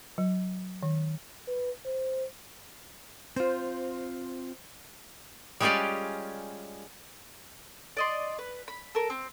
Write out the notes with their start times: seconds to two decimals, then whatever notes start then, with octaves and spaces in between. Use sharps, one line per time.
0.18 F#3
0.83 D#3
1.47 B4
1.86 C5
3.36 C4 F4 C5
5.60 G3 G#3 C#4 F4 G4 D5
7.97 D5 D#5 C6
8.39 B4
8.68 B5
8.95 A4 A#4
9.10 C4